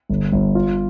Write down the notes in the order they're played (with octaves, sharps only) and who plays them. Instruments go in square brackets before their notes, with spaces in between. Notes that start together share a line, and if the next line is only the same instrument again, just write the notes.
[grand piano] G1
G1
F4